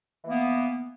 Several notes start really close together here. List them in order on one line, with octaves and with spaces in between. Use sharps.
E3 A#3 B3